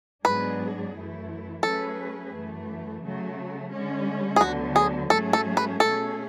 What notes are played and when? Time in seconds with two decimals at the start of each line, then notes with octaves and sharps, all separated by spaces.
0.24 G#2 F#3 B3 D4 G#4 B4
0.94 F#2 E3 A3 E4
1.63 F#3 A3 C#4 G#4 A4 B4
2.32 F#2 E3 A3
3.02 C#3 F#3 A3
3.72 D3 G#3 C#4
4.36 G#4
4.41 D2 D3 F#3 B3 F#4
4.76 G#4
5.10 G#2 F#3 A3 C#4 G#4 A4
5.33 A4
5.57 B4
5.80 B2 A3 C#4 G#4 A4